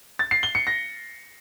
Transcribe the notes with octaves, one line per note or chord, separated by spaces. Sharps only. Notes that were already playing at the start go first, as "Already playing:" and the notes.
A6
C7
G7
C#7
A#6